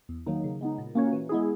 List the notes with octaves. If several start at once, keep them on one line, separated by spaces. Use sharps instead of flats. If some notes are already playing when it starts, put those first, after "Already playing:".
E2
D#3 F#3 A#3 D#4
C#3
G#3 B3 D#4
A#2
A#3 C#4 F#4 C#5
E3
G#3 B3 E4 G#4